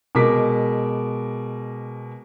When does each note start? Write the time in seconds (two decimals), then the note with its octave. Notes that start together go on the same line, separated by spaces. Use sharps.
0.15 B2 G#3 A#4 D6 B6